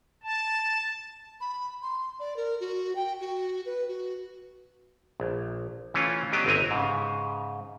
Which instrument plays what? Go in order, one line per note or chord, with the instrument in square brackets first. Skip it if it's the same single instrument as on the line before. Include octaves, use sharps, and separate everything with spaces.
[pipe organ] A5
[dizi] B5
C6
D5
A#4
F#4
G5
F#4
B4
F#4
[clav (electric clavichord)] A#1
E3 A3 C#4 F4
F#3 B3 D4 G4 D#5
G1 C4 E4 D#5 G#5 A#5
G#2 C#3